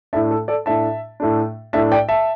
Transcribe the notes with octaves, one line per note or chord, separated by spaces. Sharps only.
A2 A3 D4 E5 A5
A4
A4 D5
A2 A3 D4 E5 A5
A2 A3 D4
A2 A3 D4 E5 A5
D5 G5
E5 A5